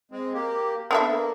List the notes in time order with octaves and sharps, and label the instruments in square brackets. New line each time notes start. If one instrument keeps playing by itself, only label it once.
[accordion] G#3 C4
A#3 G4
[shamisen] B3 D4 E5 [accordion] A4
[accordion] A#3